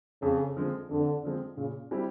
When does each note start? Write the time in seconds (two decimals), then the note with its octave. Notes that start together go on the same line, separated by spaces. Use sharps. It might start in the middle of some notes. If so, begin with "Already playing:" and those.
0.22 F2 C#3
0.56 D3 F3 G#3 C4
0.90 F2 D3
1.23 D3 F3 G#3 C4
1.57 A#2 C#3
1.91 G3 C4 E4 G4